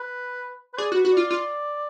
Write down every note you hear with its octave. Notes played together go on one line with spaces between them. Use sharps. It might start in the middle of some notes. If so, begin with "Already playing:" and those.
Already playing: B4
B4
G#4 D5
F#4
B4
F#4
F4 D5
F4